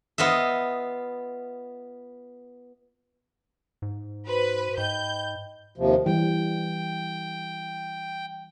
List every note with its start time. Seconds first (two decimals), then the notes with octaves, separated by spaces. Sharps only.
0.18 B3 F4 D#5 E5
3.82 G#2
4.27 F#4 B4 C5 C6
4.78 G#2 D#5 G5 B5 G6
5.76 D#2 C3 F3
6.06 E3 G3 G5